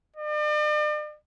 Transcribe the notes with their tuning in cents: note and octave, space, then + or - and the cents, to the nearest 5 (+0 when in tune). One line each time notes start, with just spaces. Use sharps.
D5 +40